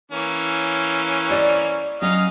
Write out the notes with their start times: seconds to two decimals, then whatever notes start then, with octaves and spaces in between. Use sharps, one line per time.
0.12 E3 A#3 C#4
1.30 C5 D5 D#5
2.02 F#3 C#4 D#5 F5 A#5